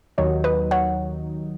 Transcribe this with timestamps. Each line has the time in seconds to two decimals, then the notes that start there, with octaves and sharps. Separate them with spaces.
0.18 D#2 D#3 F#3 D#4 C#5
0.44 B4 D#5
0.71 C#5 F#5